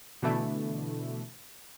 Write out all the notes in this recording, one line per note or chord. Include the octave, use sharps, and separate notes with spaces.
B2 D3 E3 A3 D4 E4